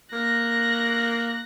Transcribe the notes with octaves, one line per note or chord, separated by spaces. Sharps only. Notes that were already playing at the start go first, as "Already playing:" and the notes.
A#3 F#6 A#6